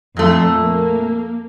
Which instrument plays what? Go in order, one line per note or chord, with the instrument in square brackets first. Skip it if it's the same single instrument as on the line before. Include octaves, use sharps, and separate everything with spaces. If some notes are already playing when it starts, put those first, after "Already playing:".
[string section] F2 [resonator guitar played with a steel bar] A#2 A3
[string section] A#3